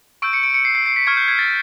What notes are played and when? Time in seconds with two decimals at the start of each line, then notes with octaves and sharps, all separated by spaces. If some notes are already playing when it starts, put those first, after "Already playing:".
0.22 C#6 E6 G6 D7
0.33 C#7
0.43 D7
0.54 C#7
0.65 C7
0.75 C7
0.86 C7
0.96 B6
1.07 C#6 F6 G#6
1.17 G6
1.28 G#6
1.39 A6